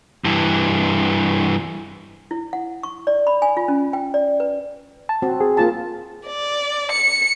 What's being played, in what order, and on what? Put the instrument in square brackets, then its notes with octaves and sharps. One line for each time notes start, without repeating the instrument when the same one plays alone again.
[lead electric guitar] G2 E3
[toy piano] E4
F#5
C#6
D5
B5
G#5
F4
C#4
G5
D5
B4
[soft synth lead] A5
[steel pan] C4 F#4
[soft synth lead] G#4
[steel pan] A#3 F4 A5
[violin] D5
C#7